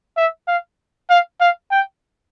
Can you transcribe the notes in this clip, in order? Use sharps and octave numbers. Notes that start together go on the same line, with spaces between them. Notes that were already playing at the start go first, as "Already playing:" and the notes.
E5
F5
F5
F5
G5